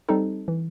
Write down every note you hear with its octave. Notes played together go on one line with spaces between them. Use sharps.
G3 C4 D#4 A4
E3